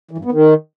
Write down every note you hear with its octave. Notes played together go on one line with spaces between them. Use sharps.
E3
G2
B3
D#3